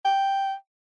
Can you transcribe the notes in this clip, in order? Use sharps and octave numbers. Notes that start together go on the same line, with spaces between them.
G5